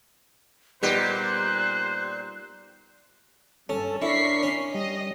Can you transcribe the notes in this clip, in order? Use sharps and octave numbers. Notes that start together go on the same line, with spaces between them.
A#2 G3 B3 D#4 G4 C5 F#6
G2 C#4 A4
D4 E4 A#4 C#6 B6 C7
C#4
G3 D#5